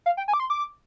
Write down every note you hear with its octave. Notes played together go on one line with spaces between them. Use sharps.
F5
G5
G#5
D6
C6
D6